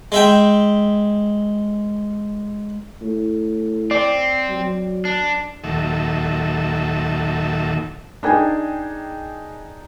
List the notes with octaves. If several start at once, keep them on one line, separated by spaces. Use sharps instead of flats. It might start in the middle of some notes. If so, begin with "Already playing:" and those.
G#3 E5 G5
A2
C4 D5
F#3
D4
D#2 A#2 D#3 F#3 A4 E5
D4 D#4 G#4 G5 G#5